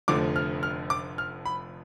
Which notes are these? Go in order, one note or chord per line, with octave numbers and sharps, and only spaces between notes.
F1 F2 D3 F3 A3 D6
F6
F6
D6
F6
B5